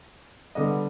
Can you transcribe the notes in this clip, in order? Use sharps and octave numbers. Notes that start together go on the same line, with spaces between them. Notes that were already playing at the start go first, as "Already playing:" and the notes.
D3 G3 B3 D#5